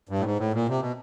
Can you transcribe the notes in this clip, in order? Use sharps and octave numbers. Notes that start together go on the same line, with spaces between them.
G2
A2
G#2
A2
A#2
C3
B2